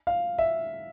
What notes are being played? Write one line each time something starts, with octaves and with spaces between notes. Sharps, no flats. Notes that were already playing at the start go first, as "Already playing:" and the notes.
F5
E5